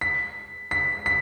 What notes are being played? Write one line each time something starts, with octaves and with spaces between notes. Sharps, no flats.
B6
B6
B6